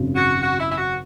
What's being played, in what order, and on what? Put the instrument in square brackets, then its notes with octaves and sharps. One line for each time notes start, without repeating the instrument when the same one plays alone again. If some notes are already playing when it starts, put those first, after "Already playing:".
Already playing: [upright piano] G#1 F#2 C#3
[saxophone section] F#4
F#4
E4
E4
F#4